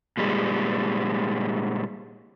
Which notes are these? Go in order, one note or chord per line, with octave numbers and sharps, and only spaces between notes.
A#2 G3 G#3